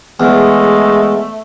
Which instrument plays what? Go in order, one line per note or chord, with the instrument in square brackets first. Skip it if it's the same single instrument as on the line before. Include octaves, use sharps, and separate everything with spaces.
[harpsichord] E2 [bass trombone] G#3 [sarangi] A3